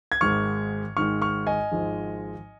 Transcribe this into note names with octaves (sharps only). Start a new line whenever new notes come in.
G#6
G#1 G#2 D#3 G#3 C#6 F6
G#1 G#2 D#3 G#3 C#6 F6
C#6 F6
D#5 G#5
G#1 G#2 F3 G#3